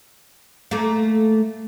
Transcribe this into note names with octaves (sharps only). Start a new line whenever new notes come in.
A3 A#3